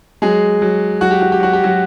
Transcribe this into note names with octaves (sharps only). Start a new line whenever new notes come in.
F#3 G#3 G#4
F#3
F#3 F#4
G4
F#4
G4
F#3 F#4
G4
F#3 F#4